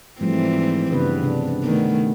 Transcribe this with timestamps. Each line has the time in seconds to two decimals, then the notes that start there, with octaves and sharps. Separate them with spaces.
0.21 G#2 E3 F3 G3 A3 C4
0.92 G2 C#3 B3 B4
1.22 C3 D4
1.64 D#3 A3 B3